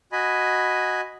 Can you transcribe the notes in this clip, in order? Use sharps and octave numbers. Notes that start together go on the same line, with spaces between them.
F#4 D#5 G#5 B5